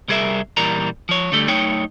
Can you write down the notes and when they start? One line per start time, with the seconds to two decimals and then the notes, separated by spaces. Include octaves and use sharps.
0.08 C2 G3 G#4 A#4 E5
0.57 A#2 E3 G3 A#4 A#5
1.09 F3 C#5
1.32 D3 G3 A3
1.48 F#2 A3 D#4 C#5 G5